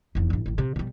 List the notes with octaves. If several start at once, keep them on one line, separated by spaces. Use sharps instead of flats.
F1 E2
A1 G2
A1 A2
C3
B2 G3